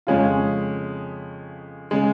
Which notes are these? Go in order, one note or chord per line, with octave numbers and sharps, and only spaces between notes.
F2 C#3 G#3 C#4 F4
C#3 G#3